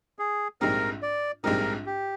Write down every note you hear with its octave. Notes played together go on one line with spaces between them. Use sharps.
G#4
A#1 G#2 G3 C4 D#4 A#4
D5
A#1 G#2 G3 C4 D#4 A#4
G4